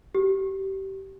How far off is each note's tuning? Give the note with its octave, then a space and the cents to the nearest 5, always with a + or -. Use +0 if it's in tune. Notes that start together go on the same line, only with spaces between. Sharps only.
G4 -25